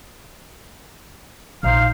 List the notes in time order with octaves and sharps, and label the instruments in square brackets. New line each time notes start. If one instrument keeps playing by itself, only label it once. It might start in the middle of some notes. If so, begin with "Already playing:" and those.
[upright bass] A#1 [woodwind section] D#4 C5 F5